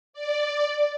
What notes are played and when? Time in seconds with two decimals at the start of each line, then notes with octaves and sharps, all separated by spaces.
0.13 D5